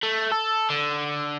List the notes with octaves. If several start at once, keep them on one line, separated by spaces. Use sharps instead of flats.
A3
A4
D3